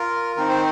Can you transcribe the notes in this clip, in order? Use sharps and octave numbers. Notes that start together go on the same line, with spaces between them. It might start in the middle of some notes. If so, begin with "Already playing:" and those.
Already playing: F4 A#4
D#3 C4 D#4 A#4
C5